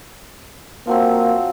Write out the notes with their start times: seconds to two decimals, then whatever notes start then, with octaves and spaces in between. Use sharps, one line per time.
0.87 F3 F#3 A#3 C4